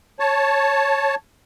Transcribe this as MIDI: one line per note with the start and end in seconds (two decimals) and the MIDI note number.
0.19 1.15 73
0.19 1.15 81